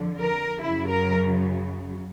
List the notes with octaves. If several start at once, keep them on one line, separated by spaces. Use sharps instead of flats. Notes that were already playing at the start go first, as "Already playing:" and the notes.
Already playing: F2 D3 F3
A#4
F#2 C#3 F#3 E4
A#4